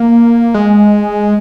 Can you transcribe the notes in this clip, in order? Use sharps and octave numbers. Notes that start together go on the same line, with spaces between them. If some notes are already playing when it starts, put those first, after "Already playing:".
Already playing: A#3
G#3